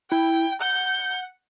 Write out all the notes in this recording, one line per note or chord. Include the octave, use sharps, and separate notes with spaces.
E4 G5
F#5 G6